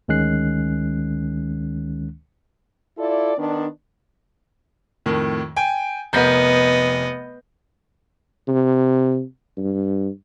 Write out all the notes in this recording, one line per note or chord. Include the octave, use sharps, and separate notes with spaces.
D2 D#3 G#3 C#4 F#6 C7
E4 F4 A4 D5
D#3 B3 D4
F2 A2 D#3
G5 G#5
F1 B3 A#4 D#5 G6
C3
G2